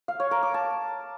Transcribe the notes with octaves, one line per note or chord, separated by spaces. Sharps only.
F5
C#5
A#4
D6
A5